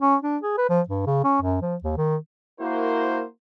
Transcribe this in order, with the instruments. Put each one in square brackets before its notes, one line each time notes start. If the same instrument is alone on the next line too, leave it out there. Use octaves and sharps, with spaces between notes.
[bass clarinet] C#4
D4
G#4
B4
F3
G2
C#3
C#4
F#2
F3
D#2
D#3
[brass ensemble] A#3 E4 F#4 A#4 C5